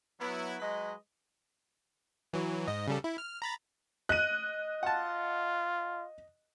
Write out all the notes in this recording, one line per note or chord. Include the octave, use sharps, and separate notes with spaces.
F#3 B3 E4
F#3 G#3 B4 D#5
E3 F#3
G#2 D#5
C#3 G3 A4
E4
F6
A#5 B5 A6
D#5 F#6 D#7
F4 F#5 A5